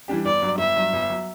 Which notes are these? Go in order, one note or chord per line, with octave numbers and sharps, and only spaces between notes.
E3 G3 D4 G4
G1 D5
G2 F#3
G1 E5
G2 F#3
G1
F#3